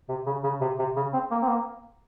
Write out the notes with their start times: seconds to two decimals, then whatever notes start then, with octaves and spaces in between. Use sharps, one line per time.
0.09 C3
0.26 C#3
0.44 C#3
0.61 C3
0.79 C3
0.96 C#3
1.14 C4
1.31 A#3
1.42 C4
1.48 A#3